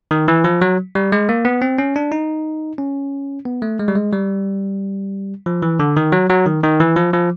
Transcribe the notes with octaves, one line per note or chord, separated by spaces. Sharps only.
D#3
E3
F3
F#3
G3
G#3
A#3
B3
C4
C#4
D4
D#4
C#4
B3
A3
G#3
G3
G#3
G3
F3
E3
D3
D#3
F#3
F#3
D#3
D#3
E3
F3
F3